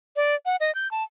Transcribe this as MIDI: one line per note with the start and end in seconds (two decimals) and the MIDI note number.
0.16 0.35 74
0.46 0.56 78
0.60 0.73 75
0.75 0.90 91
0.91 1.04 81